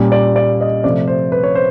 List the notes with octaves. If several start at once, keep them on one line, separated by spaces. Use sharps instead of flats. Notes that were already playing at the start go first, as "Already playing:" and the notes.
Already playing: A#2 G3 A#3 C#4
D5
D5
D#5
C3 F3 A3 D5
C5
B4
C#5
C5